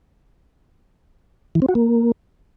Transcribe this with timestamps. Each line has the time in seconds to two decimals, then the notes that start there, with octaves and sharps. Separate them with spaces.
1.55 E3
1.62 C4
1.69 F#4
1.75 A#3